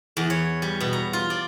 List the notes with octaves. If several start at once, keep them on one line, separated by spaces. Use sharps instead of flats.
E2
C#5
G3
B2
A#5
F4
D5